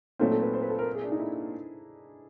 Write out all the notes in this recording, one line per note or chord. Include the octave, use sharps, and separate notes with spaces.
A#2 F#3 A3 C4 D#4
A4
B4
C5
B4
A4
A#4
G#4
D4
D#4
E4